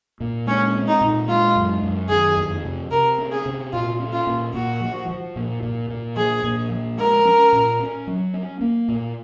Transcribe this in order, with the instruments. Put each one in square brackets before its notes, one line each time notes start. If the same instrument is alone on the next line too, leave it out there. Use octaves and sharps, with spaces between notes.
[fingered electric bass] A#2
[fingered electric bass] G#3 [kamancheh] C#4
[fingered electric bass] C4
[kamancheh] D#4
[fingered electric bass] A#2
[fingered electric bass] G#3 [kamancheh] F4
[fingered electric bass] F#2
F#2
[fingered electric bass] D#3 [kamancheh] G#4
[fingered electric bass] F2
C3
[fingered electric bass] C3 [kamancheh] A#4
[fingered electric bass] C#4
[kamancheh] G#4
[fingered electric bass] C3
[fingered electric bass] A#2 [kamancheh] F4
[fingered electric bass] C#4
[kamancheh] F4
[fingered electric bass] A#2
[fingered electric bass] A#2 [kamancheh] F#4
[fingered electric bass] F3
F3
A#2
A#2
A#2
[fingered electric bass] F3 [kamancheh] G#4
[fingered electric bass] A#2
F3
[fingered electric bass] G#3 [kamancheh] A#4
[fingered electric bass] C#4
A#2
C#4
F#3
C#4
A#3
A#2